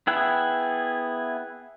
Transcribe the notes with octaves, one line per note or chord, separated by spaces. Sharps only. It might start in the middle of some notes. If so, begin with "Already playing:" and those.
B3 E4 G#4 G5 F#6